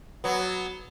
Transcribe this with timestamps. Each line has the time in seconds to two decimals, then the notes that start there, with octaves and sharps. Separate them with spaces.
0.24 F#3 B3